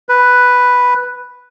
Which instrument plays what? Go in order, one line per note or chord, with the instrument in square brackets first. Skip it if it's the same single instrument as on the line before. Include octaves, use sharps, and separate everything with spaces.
[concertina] B4